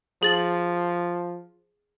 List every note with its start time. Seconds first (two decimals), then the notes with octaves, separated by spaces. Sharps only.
0.23 F3 G#4 A6 F#7